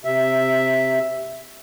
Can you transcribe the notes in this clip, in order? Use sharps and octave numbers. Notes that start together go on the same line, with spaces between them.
C3 E5